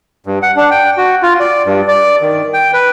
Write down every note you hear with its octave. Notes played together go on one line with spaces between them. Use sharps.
G2
F#5
D4
G5
F#4
F4
D5
G2
D5
D#3
G5
B4